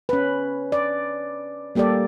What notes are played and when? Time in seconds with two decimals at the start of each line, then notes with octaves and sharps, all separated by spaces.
0.09 C#4 B4
0.72 D5
1.75 G3 A#3 G4 A4 D5